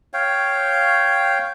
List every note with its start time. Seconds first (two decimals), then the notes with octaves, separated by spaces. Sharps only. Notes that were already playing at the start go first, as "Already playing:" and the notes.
0.13 C#5 F5 G5